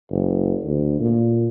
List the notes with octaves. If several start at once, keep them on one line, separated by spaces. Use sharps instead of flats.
F#1
D2
A#2